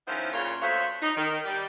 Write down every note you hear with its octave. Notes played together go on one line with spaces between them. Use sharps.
D#3 F3 B3 C#4 E4 C5
A#2 C#3 A#3 F4 C#5
D2 A3 F#4 C5 C#5 F5
D#4
D#3
G3 G4